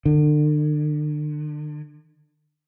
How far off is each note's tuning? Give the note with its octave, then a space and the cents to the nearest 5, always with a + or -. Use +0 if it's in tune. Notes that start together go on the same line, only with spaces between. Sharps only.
D3 +40